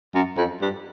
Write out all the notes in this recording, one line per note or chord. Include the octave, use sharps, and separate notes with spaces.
F#2
F2
G2